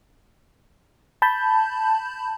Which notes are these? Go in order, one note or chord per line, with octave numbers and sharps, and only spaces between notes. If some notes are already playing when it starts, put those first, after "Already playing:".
A5 B5 G6